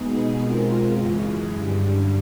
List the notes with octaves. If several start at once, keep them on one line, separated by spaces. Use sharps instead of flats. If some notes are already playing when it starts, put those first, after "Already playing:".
Already playing: B2 G#3 B3 D#4 G#4
B2 G#3 C4 F4 A#4
F#2 C#3 E3 G#3
G2 D3 G3